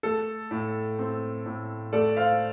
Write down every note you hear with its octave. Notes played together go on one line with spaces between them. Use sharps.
A3 A4
A2
C4
A2
A3 A4 D5
C5 F5